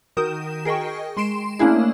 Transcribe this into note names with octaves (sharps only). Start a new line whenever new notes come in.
D#3 F#4 A#4 D#6 G6 E7
G#4 A#4 D#5 G5 C#6
G#3 C6 C7 D7 E7
A3 A#3 C#4 D4 E4 G#4